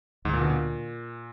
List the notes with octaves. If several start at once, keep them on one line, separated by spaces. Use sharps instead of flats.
D2 G#2
A#2
B2 D3
A#2